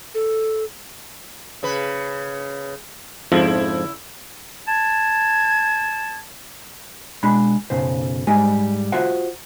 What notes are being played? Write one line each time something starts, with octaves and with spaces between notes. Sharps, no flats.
A4
C#3 B4
F2 G#2 C#3 F3 E4
A5 G#6
B2 G#3 D4 B5
B1 F#2 C#3 C5
G#2 G3 G#3 G#5
F4 F#4 C5 E5 F#5